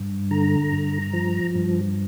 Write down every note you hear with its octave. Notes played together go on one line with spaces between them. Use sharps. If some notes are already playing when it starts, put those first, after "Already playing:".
Already playing: G2
D3 A#5
G2
F3
G2